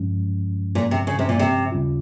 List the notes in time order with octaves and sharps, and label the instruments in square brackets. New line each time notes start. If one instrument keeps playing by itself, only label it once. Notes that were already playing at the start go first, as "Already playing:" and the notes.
Already playing: [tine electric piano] G2 F3 G#3 C#4
[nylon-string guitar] A#2
C3
C#3
C3
A#2
C3
[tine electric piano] D#2 C#3 G3 C#4 F4